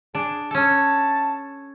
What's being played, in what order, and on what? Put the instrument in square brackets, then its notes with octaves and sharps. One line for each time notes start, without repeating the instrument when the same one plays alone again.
[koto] D4 [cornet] G#4
[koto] C#4 A4 [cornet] A5